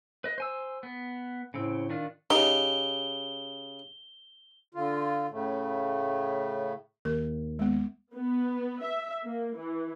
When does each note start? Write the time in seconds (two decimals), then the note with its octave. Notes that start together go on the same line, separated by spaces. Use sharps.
0.24 B4 D#5
0.38 C5 G#5 E6
0.83 B3
1.54 A2 C#3 C4
1.90 D#3 D4 F4
2.30 C#3 D#4 G4 G7
4.75 D3 F4
5.31 A2 C#3 A3
7.05 D#2 A#4
7.59 G#3 B3
8.14 B3
8.83 E5
9.26 A#3
9.57 E3